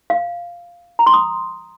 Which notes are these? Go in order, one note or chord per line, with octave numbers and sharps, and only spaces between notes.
F5
A#5
C6
D#6